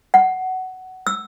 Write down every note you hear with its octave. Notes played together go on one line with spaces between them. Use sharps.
F#5
E6